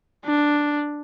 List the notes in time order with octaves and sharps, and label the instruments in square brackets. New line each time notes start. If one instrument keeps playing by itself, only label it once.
[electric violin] D4